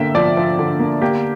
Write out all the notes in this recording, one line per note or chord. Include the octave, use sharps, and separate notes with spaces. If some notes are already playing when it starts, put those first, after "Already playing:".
Already playing: D3 A#3 E5 G5
F3 D5
F3
D3
A#3
A#3 G4